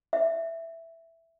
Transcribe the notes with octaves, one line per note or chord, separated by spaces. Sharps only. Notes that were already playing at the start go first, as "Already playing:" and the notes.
E5